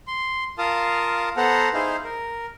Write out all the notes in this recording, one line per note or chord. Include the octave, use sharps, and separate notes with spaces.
C6
F4 A#4 F5 A5 D#6
B3 A4 C5 F#5 A#5
D#4 E4 G#4 C5 F5
A#4